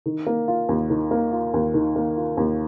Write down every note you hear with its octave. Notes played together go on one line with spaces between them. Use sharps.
D#3
A#3
F4
D#2
D#3
A#3
F4
D#2
D#3
A#3
F4
D#2